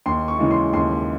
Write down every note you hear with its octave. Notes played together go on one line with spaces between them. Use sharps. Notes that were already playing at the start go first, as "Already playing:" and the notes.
D#2 C6
C#6
C#3 E3 G#3
C6
D#2 C6